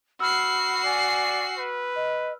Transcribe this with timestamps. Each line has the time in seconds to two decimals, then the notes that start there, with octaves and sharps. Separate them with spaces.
0.20 F#4 B5 E6 F6 C7
0.84 D5 G#5
1.58 B4
1.95 D#5